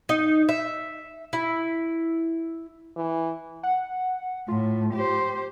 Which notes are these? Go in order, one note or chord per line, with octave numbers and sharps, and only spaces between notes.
D#4
E5
E4
E3
F#5
A2 F4
G4 C5